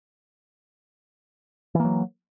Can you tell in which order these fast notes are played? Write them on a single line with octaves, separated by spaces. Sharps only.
E3 A#3 F#3